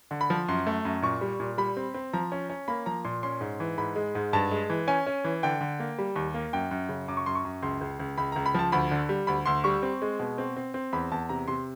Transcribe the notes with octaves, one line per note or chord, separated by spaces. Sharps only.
D3
B5
F3
F#2 C6
A3
F#2
A#2 C#6
G3
A#2
G3 B5
C4
C4
F3 A#5
C#4
C#4
A#3 B5
F3 A#5
A#2 C6
C#4 C6
G#2
E3
G#2 B5
G#3
G#2
G2 A5
G#3
E3
C#4 G#5
C#4
E3
D3 G5
D3
A#3
G3
D#2
A#3
F#2 G5
F#2
C#3
F#2 D6
C#6
F#2 C6
C#6
F#2
C#2 C6
C#2
C#2
C#2 B5
C#2 A#5
B5
F3 A5
D2 B5
D3
G3
D2 B5
D2 C6
G3 C#6
C4
G#3
B2
C4
C4
C4
E2 B5
E2 A5
C3 A#5
C3 C6